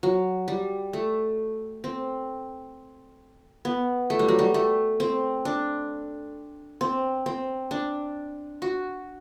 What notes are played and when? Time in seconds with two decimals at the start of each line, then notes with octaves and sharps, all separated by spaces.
0.03 F#3
0.48 G3
0.93 A3
1.84 C4
3.65 B3
4.10 A3
4.19 G3
4.28 F#3
4.39 G3
4.54 A3
5.00 C4
5.45 D4
6.81 C4
7.26 C4
7.71 D4
8.62 F#4